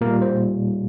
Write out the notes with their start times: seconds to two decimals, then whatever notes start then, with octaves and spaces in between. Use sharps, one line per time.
0.01 A#2 G3 A#3 A#4
0.22 C5